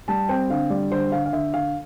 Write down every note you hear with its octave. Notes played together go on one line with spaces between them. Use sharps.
G3 A5
C4 G5
D3 F5
G3 D5
D3 C5
D3 F5
F5
D3 E5
D3 F5